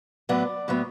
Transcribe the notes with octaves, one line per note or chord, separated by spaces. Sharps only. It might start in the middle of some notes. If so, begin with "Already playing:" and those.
A2 F#3 B3 D5
A2 F#3 B3